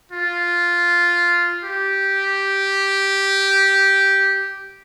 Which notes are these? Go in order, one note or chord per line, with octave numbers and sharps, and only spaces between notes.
F4
G4